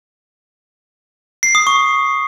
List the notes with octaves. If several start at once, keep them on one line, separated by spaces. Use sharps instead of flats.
C7
D#6
C#6